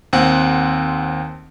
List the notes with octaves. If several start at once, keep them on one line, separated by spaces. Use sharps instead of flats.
D#2 C4 F#5